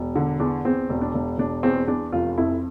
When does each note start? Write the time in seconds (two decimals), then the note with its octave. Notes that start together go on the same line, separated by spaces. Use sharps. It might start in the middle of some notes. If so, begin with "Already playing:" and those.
Already playing: E1
0.16 D3
0.40 E2 D4
0.65 E2 C4
0.90 E1
1.02 D4
1.14 E1
1.38 E1 D4
1.63 E2 C4
1.87 E2 D4
2.12 F1 F4
2.38 F2 E4